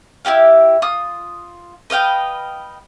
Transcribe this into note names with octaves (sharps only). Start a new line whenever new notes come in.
E4 F4 G4 F5
F4 D#6
B4 D#5 F5 G5